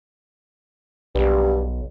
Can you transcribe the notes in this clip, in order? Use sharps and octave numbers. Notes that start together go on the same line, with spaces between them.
B1 G2